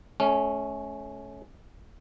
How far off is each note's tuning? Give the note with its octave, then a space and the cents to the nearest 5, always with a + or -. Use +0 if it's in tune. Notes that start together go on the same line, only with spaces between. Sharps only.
A3 -35 C#4 +0